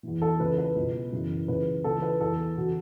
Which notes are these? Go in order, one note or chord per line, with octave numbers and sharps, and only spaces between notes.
E2 E3
A4
C#2 C#3 E3 B4
B4
C#2 B2
F#2 C#3 E3
C#2 C#3 E3 B4
C#2 C#3 E3 A4
B4
E2 E3 A4
C#3 E3 F#4